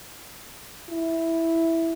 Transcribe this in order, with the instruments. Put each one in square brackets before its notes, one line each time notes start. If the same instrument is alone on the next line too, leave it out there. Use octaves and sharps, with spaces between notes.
[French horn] E4